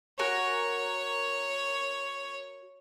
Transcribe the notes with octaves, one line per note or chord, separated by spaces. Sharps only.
F#4 A#4 C#5 G#5